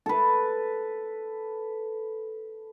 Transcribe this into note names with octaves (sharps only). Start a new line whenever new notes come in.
A4 B4